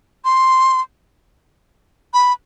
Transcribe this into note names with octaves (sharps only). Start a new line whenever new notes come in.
C6
B5